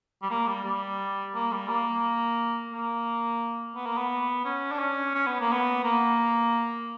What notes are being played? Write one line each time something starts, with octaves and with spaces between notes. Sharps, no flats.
G3
A#3
G3
G3
A#3
G3
A#3
A#3
B3
A#3
B3
C#4
D4
C#4
C#4
B3
A#3
B3
A#3